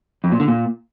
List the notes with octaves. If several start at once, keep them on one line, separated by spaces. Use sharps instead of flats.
F2
A#2
D3
A#2